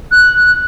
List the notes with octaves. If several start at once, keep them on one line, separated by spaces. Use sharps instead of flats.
F#6